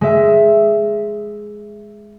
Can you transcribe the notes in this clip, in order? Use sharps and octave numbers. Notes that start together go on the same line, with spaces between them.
G#3 E5